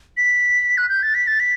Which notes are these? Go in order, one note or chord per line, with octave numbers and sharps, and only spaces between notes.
B6
F#6
G6
A6
B6
A6
B6